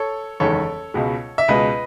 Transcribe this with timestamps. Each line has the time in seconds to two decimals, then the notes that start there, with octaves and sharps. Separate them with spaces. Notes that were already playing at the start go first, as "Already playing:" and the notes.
Already playing: A4 C#5
0.40 F#1 E2 D#3 G#3 A4 C#5
0.94 C#2 B2 G#3
1.38 E5
1.48 C#2 B2 G#3 B4 D#5